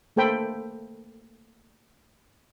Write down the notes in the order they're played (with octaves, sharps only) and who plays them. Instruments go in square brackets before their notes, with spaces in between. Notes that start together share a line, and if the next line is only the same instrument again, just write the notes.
[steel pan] A3 A#3 A4 C5 G5 B5